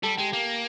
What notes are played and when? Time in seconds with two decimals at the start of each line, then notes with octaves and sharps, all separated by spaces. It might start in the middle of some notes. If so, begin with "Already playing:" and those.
0.03 G3 A4 A5
0.17 G#3 G4 G5
0.33 A#3